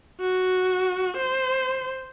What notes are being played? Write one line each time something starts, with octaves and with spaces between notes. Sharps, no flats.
F#4
C5